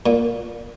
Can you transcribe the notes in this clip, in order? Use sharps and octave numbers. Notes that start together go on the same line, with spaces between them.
A#2